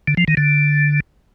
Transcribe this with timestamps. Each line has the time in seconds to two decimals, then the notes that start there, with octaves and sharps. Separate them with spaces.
0.08 D3
0.17 F3
0.28 D#3
0.37 D3